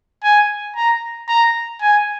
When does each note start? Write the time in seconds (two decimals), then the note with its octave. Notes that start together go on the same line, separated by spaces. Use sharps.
0.23 G#5
0.76 A#5
1.28 A#5
1.81 G#5